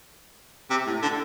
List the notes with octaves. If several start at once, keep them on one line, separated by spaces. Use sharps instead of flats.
C3
A2
D3